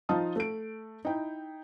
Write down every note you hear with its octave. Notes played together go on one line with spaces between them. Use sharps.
F3 D#4 F4 F5 A5 D#6
A3 D7
D#4 E4 G5